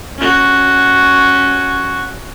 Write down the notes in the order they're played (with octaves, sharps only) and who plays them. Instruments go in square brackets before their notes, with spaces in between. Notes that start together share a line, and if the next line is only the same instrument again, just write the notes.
[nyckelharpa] C#4 F#4